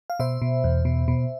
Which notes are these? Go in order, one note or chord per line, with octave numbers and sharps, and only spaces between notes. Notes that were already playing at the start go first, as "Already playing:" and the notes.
F5
B2 C5 E5
B2
E2
B2
B2